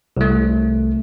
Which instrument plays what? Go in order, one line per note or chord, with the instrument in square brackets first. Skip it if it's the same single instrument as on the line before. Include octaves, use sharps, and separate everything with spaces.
[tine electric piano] C2 A3